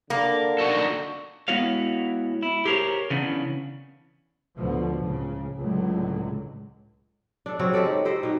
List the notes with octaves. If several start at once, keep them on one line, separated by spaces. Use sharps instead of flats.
D3 A#3
D#4 F#4 A4
G#3 B3 E4 F#4 C#5 F5
E4
G4 G#4 A#4 C5 C#5
C#3 E3 B3 C#4 D4
D2 B2 D3 F3
C#2 A2 C#3
C#2 A2 D3 F#3 G#3
D4 A4
C#3 F#3 C4 C#5
G#3 G4 A4 D5
D#4
G4 A4 C5 D#5
B2 D#4